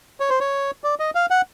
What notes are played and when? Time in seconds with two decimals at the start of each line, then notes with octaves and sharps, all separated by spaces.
0.20 C#5
0.30 C5
0.40 C#5
0.84 D5
1.00 D#5
1.15 F5
1.30 F#5